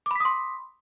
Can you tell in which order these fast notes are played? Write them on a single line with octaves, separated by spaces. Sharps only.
D6 B5 B6 D#6 C6